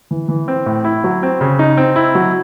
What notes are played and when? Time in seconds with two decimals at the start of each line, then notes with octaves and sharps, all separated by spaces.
0.11 E3
0.29 E3
0.48 C4
0.66 A2
0.85 E4
1.04 F#3
1.23 C4
1.41 C#3
1.59 D#4
1.77 C4
1.96 E4
2.15 F#3